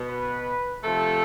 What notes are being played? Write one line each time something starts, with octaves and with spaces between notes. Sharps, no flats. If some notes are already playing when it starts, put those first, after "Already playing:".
Already playing: B2 B3
B4
C3 F3 A3 A4